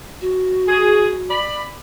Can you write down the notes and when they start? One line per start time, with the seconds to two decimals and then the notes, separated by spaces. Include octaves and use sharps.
0.21 F#4
0.67 G#4
1.29 D5 B5